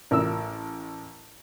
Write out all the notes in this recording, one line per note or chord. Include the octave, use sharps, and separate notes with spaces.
A1 A#4 E6